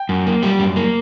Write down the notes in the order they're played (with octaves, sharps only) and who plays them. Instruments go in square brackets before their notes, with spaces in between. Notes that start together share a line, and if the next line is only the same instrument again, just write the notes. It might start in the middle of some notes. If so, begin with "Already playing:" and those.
Already playing: [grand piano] G5
[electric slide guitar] F#2
A#3
G3
F#2
A#3